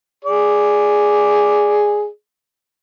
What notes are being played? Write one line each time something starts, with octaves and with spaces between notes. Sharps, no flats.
G#4 D5